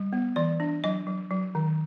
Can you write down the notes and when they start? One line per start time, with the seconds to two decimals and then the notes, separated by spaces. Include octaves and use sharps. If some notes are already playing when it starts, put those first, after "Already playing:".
Already playing: G3
0.13 B3
0.36 E3 D5
0.60 D4
0.84 F#3 D#5
1.07 F#3
1.31 F#3
1.55 D#3